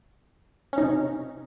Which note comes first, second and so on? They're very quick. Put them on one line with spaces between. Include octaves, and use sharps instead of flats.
C#4 D#4 C3